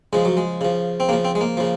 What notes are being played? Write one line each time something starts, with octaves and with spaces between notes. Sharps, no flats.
C#3 F3 G#3
F#3
G#3
C#3 F3
C4
C#3 F3 A#3
C4
G#3
A#3
C#3 F3